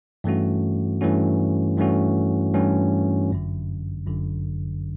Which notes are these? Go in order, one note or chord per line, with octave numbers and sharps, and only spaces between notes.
G2 E3 A3 C#4 F#4
G2 E3 A3 C#4 F#4
G2 E3 A3 C#4 F#4
G2 E3 A3 C#4 F#4
G1 F#2 D3
G1 F#2 D3